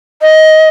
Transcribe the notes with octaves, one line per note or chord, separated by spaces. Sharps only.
D#5